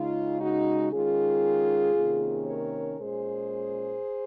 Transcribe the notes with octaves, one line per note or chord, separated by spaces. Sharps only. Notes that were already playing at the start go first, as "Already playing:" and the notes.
Already playing: C#3 G#3 D#4 F4
D#4 F#4
D#3 G#3 C#4 F4 G#4
C3 D#3 A#3 C#4
A#4 C#5
A#2 G#3 C#4 G#4 C5